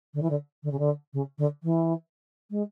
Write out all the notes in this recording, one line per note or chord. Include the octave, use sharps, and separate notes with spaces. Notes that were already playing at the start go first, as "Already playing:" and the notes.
D3
E3
D3
D3
C#3
D3
C#3
D3
E3
G#3